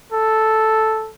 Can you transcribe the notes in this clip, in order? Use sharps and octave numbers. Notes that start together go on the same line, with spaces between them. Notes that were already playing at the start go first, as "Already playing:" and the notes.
A4